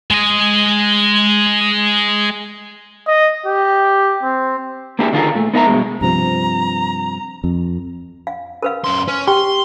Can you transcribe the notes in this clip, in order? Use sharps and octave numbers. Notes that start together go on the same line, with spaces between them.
G#3 D#5
D#5
G4
C4
A#3 D4 E4 G4 G#4
D3 D#3 F4 G4 G#4 A#4
A#2 A3
B3 D#4 A#4 E5 G#5 A#5
G2 B2 G#3
G2 C3 F3 A#5
F2
F5
A#4 B4 F5
F#2 C6
C#4 B4
G4 G5 C6